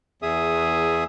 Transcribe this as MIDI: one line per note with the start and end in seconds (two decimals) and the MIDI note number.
0.22 1.04 40
0.22 1.04 68
0.22 1.04 76
0.22 1.04 87